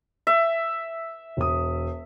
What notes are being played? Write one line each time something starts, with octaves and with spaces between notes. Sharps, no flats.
E5
E1 D#6